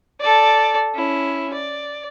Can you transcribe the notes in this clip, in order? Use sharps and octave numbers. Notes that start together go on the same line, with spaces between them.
A4 D5
C#4 E4
D5